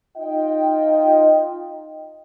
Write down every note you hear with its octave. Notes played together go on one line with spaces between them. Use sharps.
D#4 F4 D#5 G5